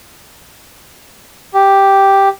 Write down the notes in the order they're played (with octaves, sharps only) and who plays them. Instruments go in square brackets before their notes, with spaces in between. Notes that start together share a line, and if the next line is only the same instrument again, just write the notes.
[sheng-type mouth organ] G4